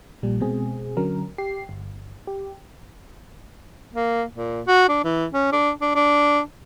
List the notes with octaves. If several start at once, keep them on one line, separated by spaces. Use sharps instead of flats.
A#1 A#2 G3
B2 G#3 C4 G#4
D3 F#3 C#4 A#4
G4 C7
G1
G4
A#3
A#2
F#4
D4
E3
C#4
D4
D4
D4